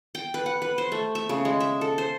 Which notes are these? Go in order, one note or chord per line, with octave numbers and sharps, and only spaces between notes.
G5
B4
F#5
B4
C5
A3
E5
C#3
G#3
E5
A4
C5